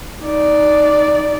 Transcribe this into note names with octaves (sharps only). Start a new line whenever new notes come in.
D#4 D5